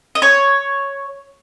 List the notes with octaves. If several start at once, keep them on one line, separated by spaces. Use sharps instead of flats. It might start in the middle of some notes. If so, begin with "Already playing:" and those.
D#5
C#5